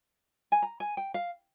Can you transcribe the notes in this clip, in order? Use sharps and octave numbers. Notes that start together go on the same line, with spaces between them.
G#5
A#5
G#5
G5
F5